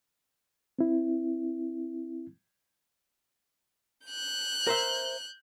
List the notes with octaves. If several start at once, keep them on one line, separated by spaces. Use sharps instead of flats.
C4 E4
F#6 G6
A#4 C5 E5